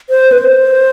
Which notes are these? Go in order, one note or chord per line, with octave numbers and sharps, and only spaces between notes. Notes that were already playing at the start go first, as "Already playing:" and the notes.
C5
B4
C5